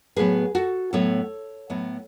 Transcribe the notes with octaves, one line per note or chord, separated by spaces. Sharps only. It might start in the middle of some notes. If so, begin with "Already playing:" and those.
A2 F#3 B3 G#4 B4
F#4 A4
A2 F#3 B3 A4 C#5
A2 F#3 B3